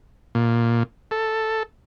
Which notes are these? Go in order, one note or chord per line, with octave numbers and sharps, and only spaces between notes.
A#2
A4